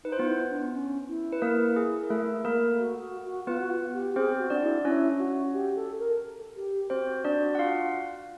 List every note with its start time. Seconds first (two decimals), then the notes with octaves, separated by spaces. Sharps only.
0.04 D#4 B4
0.12 C5
0.18 B3 F4 B4
0.28 E4
0.50 D4
0.74 C#4
1.08 E4
1.32 B4
1.42 A#3 A#4
1.76 G#4
2.03 A#4
2.10 A3 A4
2.45 A#3 A#4
2.79 F#4
3.02 F#4
3.25 F#4
3.47 B3 F4 B4
3.60 F#4
3.70 F4
3.93 G4
4.16 C4 G#4 C5
4.39 F#4
4.50 D4 D5
4.62 E4
4.85 C#4 E4 C#5
5.19 F#4
5.53 G4
5.76 A4
5.99 A#4
6.56 G4
6.90 C4 F#4 C5
7.24 D4 D5
7.55 F#5
7.59 F4 F5